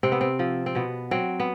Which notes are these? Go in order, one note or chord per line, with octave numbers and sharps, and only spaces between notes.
C3 C4
B3
C4
F3
C4
B2 B3
F#3 C4
B3